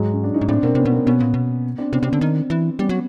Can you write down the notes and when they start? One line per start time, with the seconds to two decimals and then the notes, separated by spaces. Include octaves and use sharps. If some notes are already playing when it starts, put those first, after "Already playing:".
Already playing: G#2 F#3 G#3
0.13 C#4
0.24 D4
0.34 C#4 D#4
0.41 G#2
0.48 A2 C4 D4
0.63 B2 A#3 C4
0.75 C3 B3 C#4
0.85 B2
0.92 A#3 C4
1.06 B2 B3 C#4
1.20 A#2
1.34 B2
1.78 C4 D4
1.92 C3 B3 C#4
2.03 C3
2.07 C4 D4
2.13 D3
2.21 D#3
2.50 E3
2.79 G3 B3 C#4
2.89 F#3